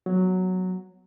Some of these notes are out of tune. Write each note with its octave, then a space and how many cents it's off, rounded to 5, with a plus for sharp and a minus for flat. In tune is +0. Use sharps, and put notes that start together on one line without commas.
F#3 +0 B3 +0